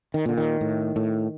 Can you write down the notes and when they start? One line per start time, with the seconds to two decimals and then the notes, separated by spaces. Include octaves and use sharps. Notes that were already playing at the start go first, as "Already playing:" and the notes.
0.14 D#3
0.26 A#2 D3
0.37 D#3
0.61 A2
0.96 A2